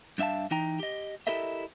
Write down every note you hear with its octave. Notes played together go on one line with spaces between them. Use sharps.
G2 D4 E5 F5 A5
E3 D#4 G5 A#5
G4 D#5
E4 G4 A4 A#4 D#5 E5